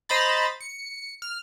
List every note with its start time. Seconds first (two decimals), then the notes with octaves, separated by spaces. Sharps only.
0.09 C5 D#5 A#5 B5 A6
0.60 C#7
1.22 F6